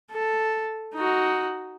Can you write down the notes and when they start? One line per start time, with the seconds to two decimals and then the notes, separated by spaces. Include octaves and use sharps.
0.11 A4
0.95 D#4 F#4